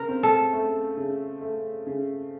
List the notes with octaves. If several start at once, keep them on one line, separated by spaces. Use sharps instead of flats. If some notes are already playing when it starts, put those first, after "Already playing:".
Already playing: C#3 A#4
C4
A4
A3
C#3
A3
C#3